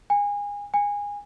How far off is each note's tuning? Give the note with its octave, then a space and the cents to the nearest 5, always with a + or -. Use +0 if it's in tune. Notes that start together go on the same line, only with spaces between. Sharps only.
G#5 -30
G#5 -25